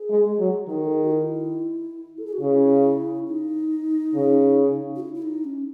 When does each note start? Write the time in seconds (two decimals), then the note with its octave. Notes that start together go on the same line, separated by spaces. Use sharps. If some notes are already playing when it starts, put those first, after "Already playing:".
Already playing: G#4
0.09 G#3
0.39 F#3
0.68 D#3 D#4
0.85 A4
0.94 G#4
1.02 F#4
1.11 E4
2.18 A4
2.26 G#4
2.33 F#4
2.41 C#3 E4
3.27 D#4
4.14 C#3
4.95 F#4
5.00 E4
5.14 E4
5.22 D#4
5.44 C#4